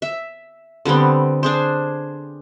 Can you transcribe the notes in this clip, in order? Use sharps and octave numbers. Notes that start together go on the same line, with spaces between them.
E5
D3 G3 B3 C4
D4 G#4 C5